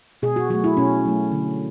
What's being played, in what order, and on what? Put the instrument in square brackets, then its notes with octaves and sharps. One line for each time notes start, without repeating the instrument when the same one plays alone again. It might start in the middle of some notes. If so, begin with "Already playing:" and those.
[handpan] B2 G#4
F#4
F#3 F#4
A3
E4
B2 C#4
F#3 A3
D3